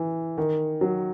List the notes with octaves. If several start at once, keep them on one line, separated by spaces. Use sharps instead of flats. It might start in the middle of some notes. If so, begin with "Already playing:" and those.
Already playing: E3
D#3
F#3